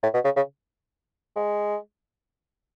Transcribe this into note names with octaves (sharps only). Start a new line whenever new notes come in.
A2
B2
C#3
C#3
G#3